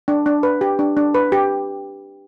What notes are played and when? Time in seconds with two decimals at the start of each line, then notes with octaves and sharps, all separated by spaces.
0.08 D4
0.26 D4
0.43 B4
0.61 G4
0.79 D4
0.97 D4
1.14 B4
1.32 G4